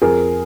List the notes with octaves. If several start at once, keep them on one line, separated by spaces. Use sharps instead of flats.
F2 G#4 A#4